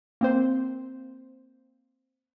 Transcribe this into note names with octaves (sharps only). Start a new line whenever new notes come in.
A#3 C4 C5